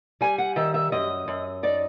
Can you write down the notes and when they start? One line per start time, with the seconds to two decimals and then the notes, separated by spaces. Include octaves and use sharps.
0.21 G3 G#5
0.38 F#5
0.56 D#3 E5
0.74 E5
0.92 F#2 D#5
1.28 F#2
1.63 D#4 D5